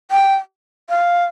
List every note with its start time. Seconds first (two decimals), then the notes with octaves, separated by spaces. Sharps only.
0.11 G5
0.89 F5